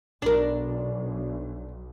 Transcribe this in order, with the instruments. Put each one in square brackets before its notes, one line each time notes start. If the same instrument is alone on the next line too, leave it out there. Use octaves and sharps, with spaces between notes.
[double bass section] B1 [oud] D4 A#4